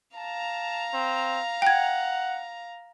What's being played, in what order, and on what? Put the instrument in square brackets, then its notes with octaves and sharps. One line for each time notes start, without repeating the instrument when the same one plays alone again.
[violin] F5 A#5 [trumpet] A5
[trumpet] C4
[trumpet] F#5 [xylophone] G5 G#6